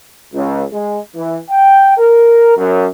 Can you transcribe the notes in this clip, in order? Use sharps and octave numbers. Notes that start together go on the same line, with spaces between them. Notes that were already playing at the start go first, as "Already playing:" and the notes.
C#2
G#3
E3
G5
A#4
F#2